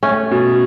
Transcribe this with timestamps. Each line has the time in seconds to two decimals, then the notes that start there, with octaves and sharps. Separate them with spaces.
0.03 A3 C#4
0.31 B2